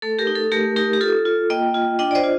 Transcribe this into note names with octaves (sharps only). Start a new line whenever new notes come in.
A3 A4
G4 A#4
D#4
A4
A3 G4 A#4
D#4 G4 A#4
G4
F4 A4
F4
A#3 D#5 G5
F4
D4 D#5 G5
D5
C5 D#5
F4